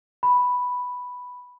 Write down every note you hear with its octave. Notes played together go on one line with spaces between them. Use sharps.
B5